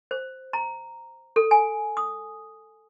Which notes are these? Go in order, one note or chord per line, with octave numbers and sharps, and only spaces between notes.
C5
A#5
A4
G#5
D#6